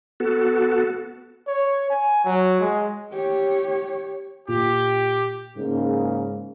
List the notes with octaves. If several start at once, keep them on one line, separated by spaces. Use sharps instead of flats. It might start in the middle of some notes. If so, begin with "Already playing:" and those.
B3 F#4 A4
C#5
G#5
F#3
G#3
G4 C#5
A#2 G4
G#2 C#3 A#3